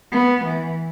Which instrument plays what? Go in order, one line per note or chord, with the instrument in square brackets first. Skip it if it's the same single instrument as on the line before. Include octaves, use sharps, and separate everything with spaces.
[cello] B3
E3